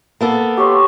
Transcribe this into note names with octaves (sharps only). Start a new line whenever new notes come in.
A#3 B3 A4
G4 C#5 C6